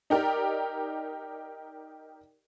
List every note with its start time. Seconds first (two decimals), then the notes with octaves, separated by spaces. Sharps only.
0.10 D#4 G4 A#4 D5